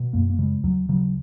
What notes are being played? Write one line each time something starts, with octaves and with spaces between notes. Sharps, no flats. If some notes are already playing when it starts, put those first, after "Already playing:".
Already playing: B2
F#2 A#3
A#3
C#3 G#3
D#2 F#3
C#3 F#3